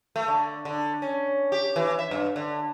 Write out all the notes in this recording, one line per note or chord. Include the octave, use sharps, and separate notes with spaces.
A3
D3
D3
C#4
G4
E3
E5
G2
D3